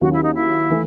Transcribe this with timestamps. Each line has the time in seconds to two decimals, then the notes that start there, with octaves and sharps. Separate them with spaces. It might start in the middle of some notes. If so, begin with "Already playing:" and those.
0.01 D#2 D#3 F#3 C#4 F#4
0.13 E4
0.23 D#4
0.35 E4
0.70 E3 A3